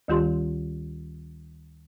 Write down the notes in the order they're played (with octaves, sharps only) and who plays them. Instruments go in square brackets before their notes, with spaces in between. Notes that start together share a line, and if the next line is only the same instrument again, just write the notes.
[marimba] D2 D#3 G3 F4 G4 C6